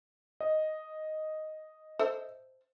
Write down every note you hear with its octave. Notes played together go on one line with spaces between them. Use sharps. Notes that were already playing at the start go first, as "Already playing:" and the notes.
D#5
A4 C5 E5